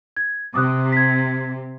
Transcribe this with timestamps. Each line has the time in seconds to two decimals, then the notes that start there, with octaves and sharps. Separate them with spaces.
0.17 G#6
0.54 C3 D6 D#6 F#6
0.93 G#6 B6